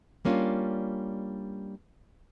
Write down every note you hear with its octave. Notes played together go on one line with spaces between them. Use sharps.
G3 A#3 C#4 D4 F4